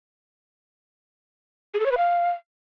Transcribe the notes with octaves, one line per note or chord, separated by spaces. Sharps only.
G#4
A4
C#5
B4
F5